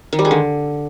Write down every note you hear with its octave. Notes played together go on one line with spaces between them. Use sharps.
D#3
G3
G#3
D3